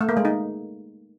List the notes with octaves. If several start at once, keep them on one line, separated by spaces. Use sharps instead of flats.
A3
A#3
G#3
D#4